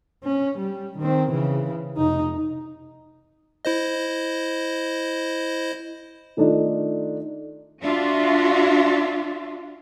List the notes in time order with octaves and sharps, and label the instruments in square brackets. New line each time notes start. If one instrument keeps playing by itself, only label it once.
[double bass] C#4
G3
D#3 C4
C#3 E3
F1 D#4
[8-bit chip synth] E4 C5 D#5
[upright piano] D#3 A3 D4 D#4 F4
[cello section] D4 F4 F#4 E5